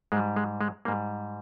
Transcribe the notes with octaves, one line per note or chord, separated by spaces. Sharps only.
G#2 G3 G#3
G#3
G#3
G#2 G3 A#3